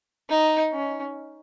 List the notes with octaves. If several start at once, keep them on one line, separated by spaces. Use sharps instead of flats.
D#4
C#4